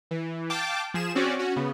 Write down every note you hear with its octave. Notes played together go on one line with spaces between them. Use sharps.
E3
F5 G5 A5 D6
F3 G#4 E7
C4 C#4 F#4 D5
C#4 F#4
C#3 B3